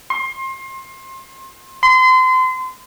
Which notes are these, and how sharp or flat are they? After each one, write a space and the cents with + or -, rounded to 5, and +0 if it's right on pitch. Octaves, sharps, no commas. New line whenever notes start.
C6 +30
C6 -30